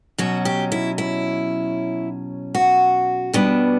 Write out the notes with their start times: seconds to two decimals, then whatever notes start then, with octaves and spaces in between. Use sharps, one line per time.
0.18 B2 F#3 C#4 F#4
0.45 G4
0.72 E4
0.98 E4
2.55 F#4
3.34 B2 G3 B3 D4